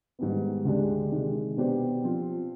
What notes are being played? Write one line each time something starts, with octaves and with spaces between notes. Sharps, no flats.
G#2 D#3 G3 B3
D2 D3 G#3 D4 G4
C3 D#3 G#3
B2 B3 D4 G4 C5
F3 C4 F4